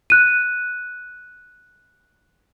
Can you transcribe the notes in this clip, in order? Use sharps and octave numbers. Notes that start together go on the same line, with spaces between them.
F#6 D#7